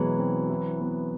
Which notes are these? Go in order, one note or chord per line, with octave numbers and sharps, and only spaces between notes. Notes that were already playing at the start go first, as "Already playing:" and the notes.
Already playing: B2 E3 F#3 G#3
C4
E4
B3